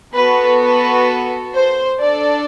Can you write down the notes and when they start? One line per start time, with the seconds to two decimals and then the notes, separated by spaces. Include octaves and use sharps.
0.15 B3 F#4 A4 B4
0.62 B4
1.55 C5
2.01 D4 A4 D5